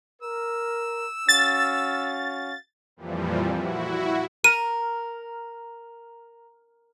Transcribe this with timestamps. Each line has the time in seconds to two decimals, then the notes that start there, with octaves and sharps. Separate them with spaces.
0.22 A#4 E6
1.29 C#4 F#4 F5 A6
2.96 F2 A#2 E3 F3 G3
3.56 E4 F#4
4.44 A#4 D#7